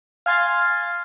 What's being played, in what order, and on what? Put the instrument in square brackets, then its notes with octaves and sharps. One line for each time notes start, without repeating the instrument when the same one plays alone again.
[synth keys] F5 G#5 C6 A6 C7